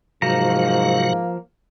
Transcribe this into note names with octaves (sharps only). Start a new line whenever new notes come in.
G#2 C3 F3 F#3 A#3 F#4 A#5